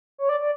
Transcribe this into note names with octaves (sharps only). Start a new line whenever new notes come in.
C#5
D5
D5